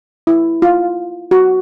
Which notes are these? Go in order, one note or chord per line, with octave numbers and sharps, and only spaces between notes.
E4
F4
F#4